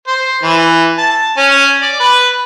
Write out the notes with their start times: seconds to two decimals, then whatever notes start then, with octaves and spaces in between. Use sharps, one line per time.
0.08 C5
0.43 E3
0.98 A5
1.37 C#4
1.82 D5
2.00 B4